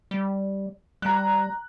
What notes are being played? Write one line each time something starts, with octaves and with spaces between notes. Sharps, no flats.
G3
G3 A#5 F#6